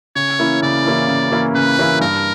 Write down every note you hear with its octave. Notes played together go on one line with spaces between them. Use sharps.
C#3 C#5
E3 A#3 C#4 E4
C#3 D5
E3 A#3 C#4 E4
C#3
E3 A#3 C#4 E4
C#3 B4
E3 A#3 C#4 E4
G2 A#4